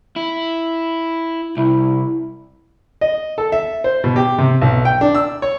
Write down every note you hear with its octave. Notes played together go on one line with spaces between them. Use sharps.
E4
C2 E4
D#5
A4
E5
C5
B2
G4
C3
B1
G5
D4
E6
C#5